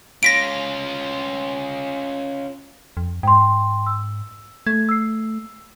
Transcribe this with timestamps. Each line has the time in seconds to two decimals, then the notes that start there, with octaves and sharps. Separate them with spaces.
0.23 C#4 F4 A#6 B6 D7
2.97 F2
3.23 G#2 G5 C6
3.87 E6
4.67 A3 G#6
4.89 E6 C7